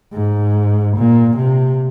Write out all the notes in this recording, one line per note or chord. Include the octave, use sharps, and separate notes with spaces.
G#2
A#2
C3